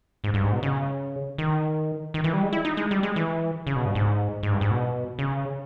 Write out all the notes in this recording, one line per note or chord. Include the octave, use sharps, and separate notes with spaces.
G#2
G2
G#2
B2
C#3
D#3
D#3
E3
G3
G#3
E4
D#4
G#3
G3
G#3
E3
C#3
B2
G2
G#2
G#2
G2
G#2
B2
C#3